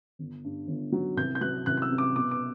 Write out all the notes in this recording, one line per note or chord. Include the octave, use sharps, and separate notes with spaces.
G1
G2
G1
F#3
C2 G6
G6
F#3 F#6
C2 F#6
F#6
E6
C3
D6
B2 D6
D6